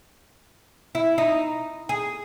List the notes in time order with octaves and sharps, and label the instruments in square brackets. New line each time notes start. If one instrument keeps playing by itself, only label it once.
[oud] E4
D#4
G#4